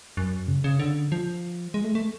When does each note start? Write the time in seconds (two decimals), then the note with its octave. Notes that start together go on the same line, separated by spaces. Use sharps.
0.17 F#2
0.48 C#3
0.64 C#3
0.79 D3
1.12 F3
1.74 G#3
1.84 A3
1.95 A3